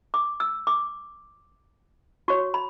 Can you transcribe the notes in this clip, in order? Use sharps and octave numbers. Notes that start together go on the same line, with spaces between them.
D6
E6
D6
F#4 C#5 C#6
B5